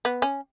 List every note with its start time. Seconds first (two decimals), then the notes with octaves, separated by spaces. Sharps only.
0.05 B3
0.22 C#4